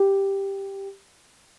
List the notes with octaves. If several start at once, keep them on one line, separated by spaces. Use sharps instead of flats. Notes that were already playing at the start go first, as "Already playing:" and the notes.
Already playing: G4